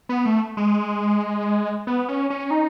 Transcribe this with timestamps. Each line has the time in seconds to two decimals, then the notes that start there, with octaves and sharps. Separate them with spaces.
0.09 B3
0.26 A3
0.57 G#3
1.87 B3
2.09 C#4
2.30 C#4
2.51 D#4